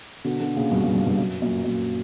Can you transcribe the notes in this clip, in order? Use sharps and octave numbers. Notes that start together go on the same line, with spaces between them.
B2 D3
B2 D3
A#2 C#3
G2 B2
G2
G2
G2
F#2
F#2 A#2
F#2 A#2